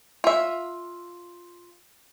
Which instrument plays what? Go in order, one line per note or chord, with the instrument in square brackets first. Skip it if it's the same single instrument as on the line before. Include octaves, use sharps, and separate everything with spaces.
[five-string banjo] F4 E5